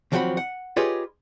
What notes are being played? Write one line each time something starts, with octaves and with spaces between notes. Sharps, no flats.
D#2 F3 F#3 C4 F#5 B5
F#5
F4 G4 G#4 B4 C#5 D#5